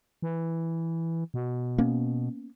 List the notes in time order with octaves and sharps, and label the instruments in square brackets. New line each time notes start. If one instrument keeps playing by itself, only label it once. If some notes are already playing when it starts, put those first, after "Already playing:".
[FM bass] E3
B2
[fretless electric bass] A#3 B3 C#4